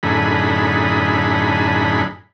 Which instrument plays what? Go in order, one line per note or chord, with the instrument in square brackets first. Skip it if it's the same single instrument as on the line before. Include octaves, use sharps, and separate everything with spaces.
[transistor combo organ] F#2 A2 D3 D#4 G#4 B5